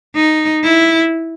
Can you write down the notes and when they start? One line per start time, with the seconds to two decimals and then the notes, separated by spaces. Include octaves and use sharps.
0.16 D#4
0.64 E4